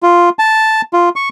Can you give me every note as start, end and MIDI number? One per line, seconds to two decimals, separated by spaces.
0.03 0.29 65
0.39 0.81 81
0.93 1.09 65
1.16 1.29 85